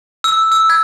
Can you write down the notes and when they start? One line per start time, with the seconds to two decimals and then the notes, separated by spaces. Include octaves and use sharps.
0.24 E6
0.52 E6
0.70 G#6